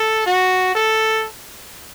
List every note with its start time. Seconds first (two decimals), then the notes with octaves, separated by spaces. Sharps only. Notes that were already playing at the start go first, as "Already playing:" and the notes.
Already playing: A4
0.26 F#4
0.75 A4